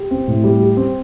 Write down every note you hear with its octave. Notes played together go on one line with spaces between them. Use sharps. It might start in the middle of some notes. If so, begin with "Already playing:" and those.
Already playing: G4
C4
A2
G3
G4
C4